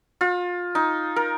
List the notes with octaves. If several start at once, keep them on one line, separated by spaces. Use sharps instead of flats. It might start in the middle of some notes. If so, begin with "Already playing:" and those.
F4
D#4
A#4